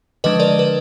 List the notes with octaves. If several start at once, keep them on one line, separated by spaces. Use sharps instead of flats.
D3 F3 G#3 D4 B4 D#5
A#4 D5
B4